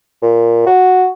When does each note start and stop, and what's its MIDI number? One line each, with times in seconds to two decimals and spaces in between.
0.22 0.65 46
0.66 1.07 66